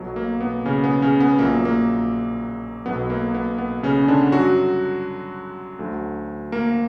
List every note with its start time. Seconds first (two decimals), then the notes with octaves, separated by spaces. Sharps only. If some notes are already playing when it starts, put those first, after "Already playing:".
Already playing: B1 B2 F#3
0.16 A#3
0.41 B3
0.66 C#3 C#4
0.84 B3
1.02 C#3 C#4
1.20 B3
1.39 A#1 A#2 F#3 A#3
1.65 A#3
2.86 B1 B2 F#3 B3
3.10 A#3
3.34 B3
3.58 B3
3.83 C#3 C#4
4.08 D3 D4
4.32 F#2 D3 F#3 G3 F#4
5.79 D2 D3 F#3
6.52 A#3 A#4